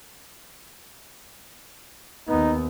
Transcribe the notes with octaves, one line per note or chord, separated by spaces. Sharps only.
D#2 B3 D#4